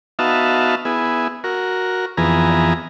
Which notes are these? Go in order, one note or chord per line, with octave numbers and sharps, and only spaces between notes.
B3 D#4 F#4 E5 F5 A5
B3 E4 G#4
F#4 A#4
F2 E3 B3 G#4 A#5